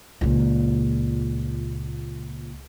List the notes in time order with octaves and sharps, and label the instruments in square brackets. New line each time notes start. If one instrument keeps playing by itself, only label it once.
[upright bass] C#2 A#2